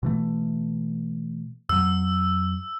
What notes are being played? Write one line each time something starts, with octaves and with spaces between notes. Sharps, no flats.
B2 E3 A3
F2 F#3 E6